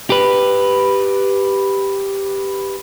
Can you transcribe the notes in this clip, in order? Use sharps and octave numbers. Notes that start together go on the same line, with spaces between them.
G4 B4